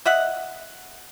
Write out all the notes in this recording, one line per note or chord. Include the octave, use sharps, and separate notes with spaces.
D#5 E5 F#5